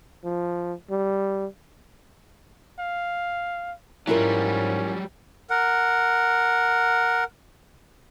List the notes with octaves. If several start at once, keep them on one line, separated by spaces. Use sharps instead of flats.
F3
G3
F5
G#2 F#3 G3 C#4 E4 F4 A#4
A#4 F#5